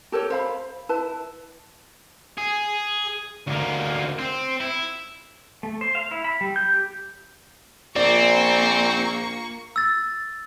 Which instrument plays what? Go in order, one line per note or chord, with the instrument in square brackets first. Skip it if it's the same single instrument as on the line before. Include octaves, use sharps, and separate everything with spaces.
[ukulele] G4 A4 A#4 C#5
C5 F5 B5
E4 B4 A5
[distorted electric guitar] G#4
D2 A#3
C4
E4
[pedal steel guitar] A3
C5
F5
E4
B5
G3
G6
G4
[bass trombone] A#1 [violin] A#3 C#6 [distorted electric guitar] C4 [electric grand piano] D5
[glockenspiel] E6 A6